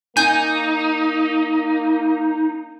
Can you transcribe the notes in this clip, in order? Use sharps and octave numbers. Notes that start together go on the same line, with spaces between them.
A#3 D#4 G#5 G6